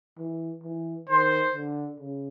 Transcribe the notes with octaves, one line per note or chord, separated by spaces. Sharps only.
E3
E3
D#3 C5
D3
C#3